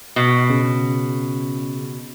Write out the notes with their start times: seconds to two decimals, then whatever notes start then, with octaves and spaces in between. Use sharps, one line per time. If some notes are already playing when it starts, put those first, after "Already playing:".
0.16 B2
0.50 C#3